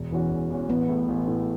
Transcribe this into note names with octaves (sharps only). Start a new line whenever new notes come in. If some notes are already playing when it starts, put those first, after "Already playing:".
Already playing: E1
E2 E3 C#4 F#4
E1
E2 E3 C#4 F#4
A1 B3
A2 A3
A1
A2 A3